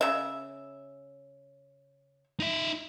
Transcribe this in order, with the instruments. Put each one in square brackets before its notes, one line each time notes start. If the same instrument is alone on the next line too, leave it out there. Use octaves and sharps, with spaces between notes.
[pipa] C#3 E5
[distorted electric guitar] D#4 E5